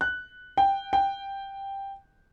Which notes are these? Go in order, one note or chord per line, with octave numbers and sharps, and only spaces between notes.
F#6
G5
G5